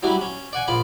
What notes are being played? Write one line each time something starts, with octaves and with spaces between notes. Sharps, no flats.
F#3 G3 D4 E4
C#4
D5 F#5 G#5
A#1 F4 D5 B5